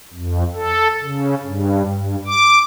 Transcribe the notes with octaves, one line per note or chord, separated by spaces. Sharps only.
F2
A4
C#3
G2
G2
D6